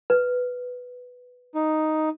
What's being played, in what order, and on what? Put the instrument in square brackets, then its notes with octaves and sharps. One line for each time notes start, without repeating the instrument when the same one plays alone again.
[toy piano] B4
[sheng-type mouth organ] D#4